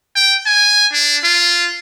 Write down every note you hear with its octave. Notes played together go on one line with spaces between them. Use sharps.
G5
G#5
D4
F4